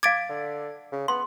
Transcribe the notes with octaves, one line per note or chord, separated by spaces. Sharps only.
F5 D6 G#6 A6 D7
D3
C#3
B3 C6